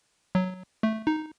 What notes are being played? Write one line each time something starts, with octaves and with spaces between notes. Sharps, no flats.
F#3
A3
D#4